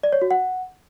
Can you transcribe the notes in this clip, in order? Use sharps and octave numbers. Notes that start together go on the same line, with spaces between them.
D5
C#5
F#4
F#5